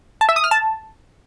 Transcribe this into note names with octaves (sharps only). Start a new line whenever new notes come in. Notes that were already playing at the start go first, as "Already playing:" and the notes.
A5
E5
D#6
F6
A5